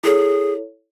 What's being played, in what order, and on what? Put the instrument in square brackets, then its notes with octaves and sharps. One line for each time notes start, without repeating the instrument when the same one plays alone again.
[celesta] E4 A4 C#5 [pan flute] G#4